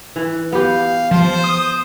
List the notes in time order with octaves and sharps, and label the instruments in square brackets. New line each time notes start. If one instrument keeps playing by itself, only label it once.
[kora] E3
[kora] B3 G4 [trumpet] F5
[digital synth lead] F3 [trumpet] C5
[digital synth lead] D#6